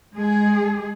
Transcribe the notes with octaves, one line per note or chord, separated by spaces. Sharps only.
G#3 G#4